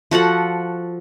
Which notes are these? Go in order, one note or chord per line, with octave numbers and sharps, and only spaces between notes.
F3 F#4 A4 F#5